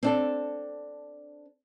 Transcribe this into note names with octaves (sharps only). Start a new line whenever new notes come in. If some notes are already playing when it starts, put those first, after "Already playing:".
C4 D4 A4